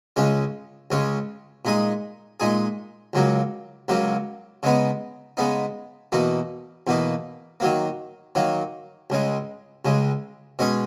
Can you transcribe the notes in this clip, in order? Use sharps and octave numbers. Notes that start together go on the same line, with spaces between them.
C#2 C#3 G#3 C#4
C#2 C#3 G#3 C#4
A#2 G#3 D#4 G#4
A#2 G#3 D#4 G#4
C#2 C#3 F#3 A#3
C#2 C#3 F#3 A#3
C#3 G#3 B3 D#4
C#3 G#3 B3 D#4
E2 B2 A#3 D#4
E2 B2 A#3 D#4
D#3 F#3 A#3
D#3 F#3 A#3
C#2 C#3 G#3
C#2 C#3 G#3
B2 G#3 C#4 G#4